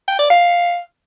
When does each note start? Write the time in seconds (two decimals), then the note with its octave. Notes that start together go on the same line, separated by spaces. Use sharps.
0.08 G5
0.19 D5
0.30 F5